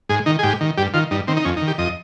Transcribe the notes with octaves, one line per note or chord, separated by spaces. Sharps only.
G#2 G#4
D#3 D#4
G#4
G#2 G4
D#3
G2 G4
D#3 F4
G2 D#4
D#3 C4
D#4
F2 C#4
D#4
D#3
G4
F2 D#5